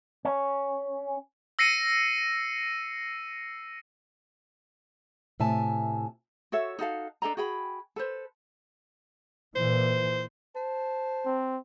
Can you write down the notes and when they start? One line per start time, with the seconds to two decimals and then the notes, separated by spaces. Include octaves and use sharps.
0.25 C#4
1.59 E6 A#6 C7 C#7 D#7
5.40 A2 C3 E5 G#5 A5
6.52 F#4 A4 C#5 E5
6.79 D#4 F#4 A4 F5
7.22 D4 A4 D#5 A#5
7.37 F#4 G#4 G5 B5
7.96 A4 B4 C5
9.56 A#2 E3 C5
10.55 C5 A5
11.26 C4